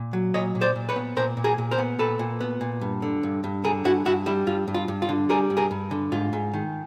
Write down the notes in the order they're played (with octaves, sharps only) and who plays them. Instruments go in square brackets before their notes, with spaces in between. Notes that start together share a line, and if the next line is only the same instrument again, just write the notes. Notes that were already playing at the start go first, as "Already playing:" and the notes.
Already playing: [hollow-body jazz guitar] A#2
F#3
A#2 C#5 D#5
A#2
C5 D5
A#2
B4 C#5
B3
A#2 A#4 C5
A#2
G#4 A#4
A#2
A#4 C5
B3
A#2 A4 B4
A#2
B3
A#2
G2
D3
G2
G2
D3 G#4 A#4
G2 E4 F#4
G2 E4 F#4
G3 E4
G2 F4
G2
F4
G2
F4
D3
G3 G#4 A#4
G2
G#4 A#4
G2
D3
G#2 F4
G#2
D#3